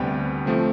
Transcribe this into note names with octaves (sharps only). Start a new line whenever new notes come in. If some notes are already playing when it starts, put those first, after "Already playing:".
Already playing: D2 C3 G3 B3 G5
F3 A3 C4